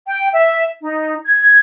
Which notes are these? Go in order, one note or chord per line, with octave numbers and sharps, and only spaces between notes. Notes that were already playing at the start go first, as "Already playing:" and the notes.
G5
E5
D#4
G#6